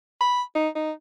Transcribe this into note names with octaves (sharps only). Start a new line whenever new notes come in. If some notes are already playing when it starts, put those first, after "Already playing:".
B5
D#4
D#4